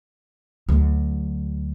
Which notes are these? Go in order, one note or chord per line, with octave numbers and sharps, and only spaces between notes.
D2 F#3